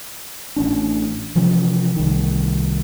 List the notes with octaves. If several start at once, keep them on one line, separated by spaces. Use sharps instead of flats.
A1 C#4 D4
C3 E3 F3 C#4
C2 D#3